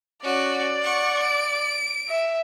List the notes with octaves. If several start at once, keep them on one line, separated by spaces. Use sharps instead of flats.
C#4 F#4 D5
F#5 C#6
D7
E5